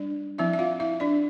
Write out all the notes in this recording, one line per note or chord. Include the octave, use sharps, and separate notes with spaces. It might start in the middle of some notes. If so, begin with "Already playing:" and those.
Already playing: G3 D4 D5
F3 C4 E4 E5
E5
F4 F5
E4 E5
D4 D5